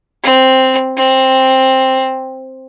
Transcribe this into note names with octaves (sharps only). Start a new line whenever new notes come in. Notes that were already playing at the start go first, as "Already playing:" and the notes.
C4
C4